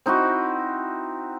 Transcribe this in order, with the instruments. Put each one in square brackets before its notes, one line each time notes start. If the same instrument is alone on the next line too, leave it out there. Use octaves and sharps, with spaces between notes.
[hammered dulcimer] C4 D#4 E4 F#4